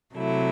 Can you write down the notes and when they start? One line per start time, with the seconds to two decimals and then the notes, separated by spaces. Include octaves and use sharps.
0.15 C3 F#3 A3 E4